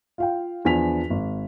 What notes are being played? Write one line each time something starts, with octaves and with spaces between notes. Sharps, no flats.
F4 F5 G5
E2 F3 D4 G#5 B6 F7
G#1